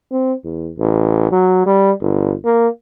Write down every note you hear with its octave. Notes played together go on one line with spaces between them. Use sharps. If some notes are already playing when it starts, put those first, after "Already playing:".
C4
E2
A1
F#3
G3
G1
A#3